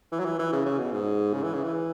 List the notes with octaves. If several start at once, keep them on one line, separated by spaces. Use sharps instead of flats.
E3
F#3
E3
E3
C#3
C#3
B2
G#2
C#3
E3
C#3
E3